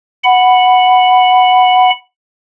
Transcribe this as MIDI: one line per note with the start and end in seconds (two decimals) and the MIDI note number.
0.24 1.90 78
0.24 1.90 83